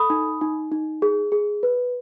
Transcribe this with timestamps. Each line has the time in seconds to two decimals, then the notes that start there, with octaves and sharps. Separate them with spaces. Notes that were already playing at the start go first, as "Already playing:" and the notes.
Already playing: A4 B5 D#6
0.10 D#4
0.41 D#4
0.72 D#4
1.02 G#4
1.32 G#4
1.63 B4